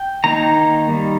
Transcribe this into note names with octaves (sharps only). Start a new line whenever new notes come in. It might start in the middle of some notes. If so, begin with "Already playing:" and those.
Already playing: G5
D#3 A#3 D#4 A#5
D#3 G3